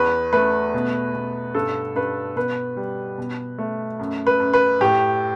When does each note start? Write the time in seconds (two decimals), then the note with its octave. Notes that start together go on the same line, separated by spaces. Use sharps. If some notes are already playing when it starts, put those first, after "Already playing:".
Already playing: E2 B4
0.33 A3 B4
0.74 B2
1.14 B2
1.55 G2 A4
1.95 G2 B4
2.36 B2 B4
2.77 G3
3.18 B2
3.59 A3
3.99 F#2
4.27 B4
4.40 F#2
4.53 B4
4.81 A2 G4